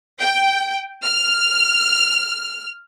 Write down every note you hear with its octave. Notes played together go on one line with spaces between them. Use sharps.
G5
F6